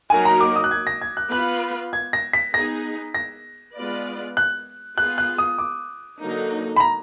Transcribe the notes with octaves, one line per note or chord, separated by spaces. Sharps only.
F#3 A#3 D#4 F#4 A#4 G#5
A#5
D6
D#6
F#6
G#6
A#6
G#6
F#6
B3 F4 B4 F#6
G#6
A#6
B6
B3 D#4 G#4 A#6
A#6
G#3 B3 F4 B4 D5
F#6
B3 F4 G#4 F#6
F#6
D#6
D6
D3 F#3 A#3 D#4
B5
A#5